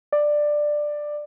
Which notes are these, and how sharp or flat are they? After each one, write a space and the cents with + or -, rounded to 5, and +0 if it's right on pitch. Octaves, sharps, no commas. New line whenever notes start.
D5 +10